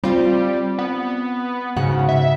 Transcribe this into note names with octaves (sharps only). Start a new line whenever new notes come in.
G3 C4 F4
B3
G#2 C#3 F#4 F#5
E5